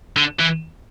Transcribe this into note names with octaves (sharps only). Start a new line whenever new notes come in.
D3
E3